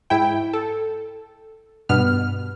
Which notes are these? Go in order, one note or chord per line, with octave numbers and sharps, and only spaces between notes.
G#2 E4 G5
A4
G2 B2 B3 F6